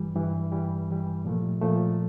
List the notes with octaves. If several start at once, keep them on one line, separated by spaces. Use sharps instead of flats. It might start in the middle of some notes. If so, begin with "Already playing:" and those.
Already playing: G2 E3 G3
G2 E3 G3
G2 E3 G3
G2 E3 G3
A#2 F3 A3
A#2 F3 A3